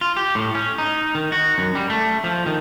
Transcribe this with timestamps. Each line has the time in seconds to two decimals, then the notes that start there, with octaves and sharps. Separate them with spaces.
0.01 F4
0.17 G4
0.35 A2
0.55 C#4
0.78 D#4
1.15 D#3
1.32 F#4
1.58 F#2
1.75 G3
1.90 A3
2.24 F3
2.46 D#3